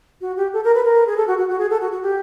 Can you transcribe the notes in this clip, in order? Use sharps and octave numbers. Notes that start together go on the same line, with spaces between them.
F#4
G4
A4
A#4
B4
A#4
G#4
A4
F#4
F#4
F#4
G#4
A4
F#4
F#4
G4